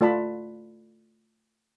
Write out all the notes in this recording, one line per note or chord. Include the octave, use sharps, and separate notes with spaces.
A3 F4 D5 A5 B5